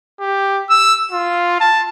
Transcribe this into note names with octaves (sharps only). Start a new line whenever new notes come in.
G4
E6
F4
A5